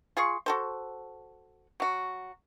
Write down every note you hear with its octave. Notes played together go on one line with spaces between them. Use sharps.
F4 G#4 C6 C#6
F#4 A4 C5
F#3 F#4